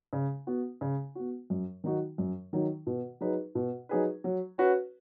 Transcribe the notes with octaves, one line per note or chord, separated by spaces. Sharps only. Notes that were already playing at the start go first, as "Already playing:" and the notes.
C#3
B3 F#4
C#3
B3 F#4
F#2
D#3 F#3 D#4 F#4
F#2
D#3 F#3 D#4 F#4
B2
F#3 D#4 G#4 B4
B2
F#3 D#4 G#4 B4
F#3
C#4 F#4 B4